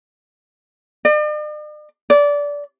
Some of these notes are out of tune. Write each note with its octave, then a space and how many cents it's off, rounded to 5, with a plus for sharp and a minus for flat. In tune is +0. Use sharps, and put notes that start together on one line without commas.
D5 +45
D5 -20